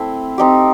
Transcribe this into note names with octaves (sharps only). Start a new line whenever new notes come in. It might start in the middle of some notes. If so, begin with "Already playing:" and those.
Already playing: A3 C4 E4
C4 D#4 G4